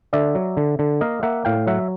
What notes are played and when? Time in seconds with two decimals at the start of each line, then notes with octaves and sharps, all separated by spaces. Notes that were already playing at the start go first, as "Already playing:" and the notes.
0.13 D3 D5 E5
0.35 F#3
0.57 D3
0.79 D3
1.01 A#3 D#5 F5
1.23 A#3 E5 F#5
1.45 A2 F5 G5
1.67 F#3 E5 F#5